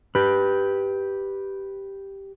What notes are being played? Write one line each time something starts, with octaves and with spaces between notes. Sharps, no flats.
G4 B4